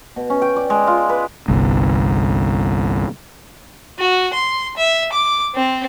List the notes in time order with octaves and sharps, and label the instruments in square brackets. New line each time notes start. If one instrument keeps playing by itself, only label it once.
[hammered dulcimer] B2
C#4
G5
D5
G#3
F4
B4
[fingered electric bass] G1 C2
[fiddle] F#4
C6
E5
D6
C4